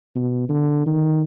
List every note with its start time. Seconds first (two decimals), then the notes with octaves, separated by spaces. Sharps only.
0.15 B2
0.49 D3
0.86 D#3